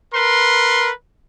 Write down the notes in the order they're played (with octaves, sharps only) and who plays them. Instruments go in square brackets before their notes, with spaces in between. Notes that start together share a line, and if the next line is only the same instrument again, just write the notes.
[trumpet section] A#4 B4 C6